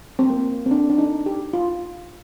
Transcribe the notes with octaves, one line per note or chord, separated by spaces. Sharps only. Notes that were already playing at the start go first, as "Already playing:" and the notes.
C4
A#3
C4
D4
D4
D#4
G4
F4